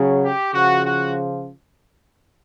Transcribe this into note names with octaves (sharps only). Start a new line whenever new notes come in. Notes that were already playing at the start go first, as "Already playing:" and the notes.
Already playing: C#3 F#3
G4
C#3 F3 F#4
F#4